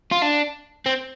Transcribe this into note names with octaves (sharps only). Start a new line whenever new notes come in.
F4
D4
C4